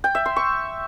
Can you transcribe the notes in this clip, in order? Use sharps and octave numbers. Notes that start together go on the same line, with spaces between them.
G5
E5
C6
C#6